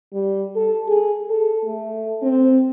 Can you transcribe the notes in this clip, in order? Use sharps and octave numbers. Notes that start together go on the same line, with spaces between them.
G3
A4
G#4
A4
A3
C4